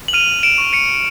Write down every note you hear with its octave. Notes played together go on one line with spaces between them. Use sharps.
F#7
F6 D#7 F7
D7 E7
C#6
C#7 D#7